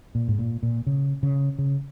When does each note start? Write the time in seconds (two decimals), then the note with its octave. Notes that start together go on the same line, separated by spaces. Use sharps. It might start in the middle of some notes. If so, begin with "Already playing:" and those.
0.15 A#2
0.28 G#2
0.39 A#2
0.63 A#2
0.87 C#3
1.23 C#3
1.59 C#3